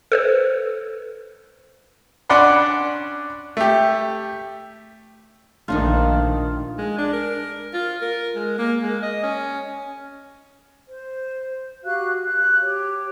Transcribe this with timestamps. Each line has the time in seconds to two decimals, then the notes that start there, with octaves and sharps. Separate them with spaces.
0.12 A4 B4 C5
2.30 C#4 D4 D5 F#5 B5 C6
3.57 A3 G4
5.68 A#1 D#3 A3 D4 D#4 F4
6.78 G#3
6.98 D4
7.13 A#4
7.74 F4
8.02 A#4
8.36 G#3
8.58 A#3
8.83 G#3
9.02 D#5
9.24 C#4
10.86 C5
11.84 F#4 G4 F5 F#6
12.24 F#6
12.62 G4 C#5